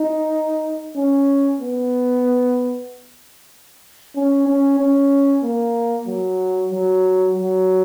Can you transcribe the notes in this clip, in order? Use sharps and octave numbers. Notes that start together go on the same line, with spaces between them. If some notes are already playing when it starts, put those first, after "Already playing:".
Already playing: D#4
C#4
B3
C#4
C#4
C#4
A#3
F#3
F#3
F#3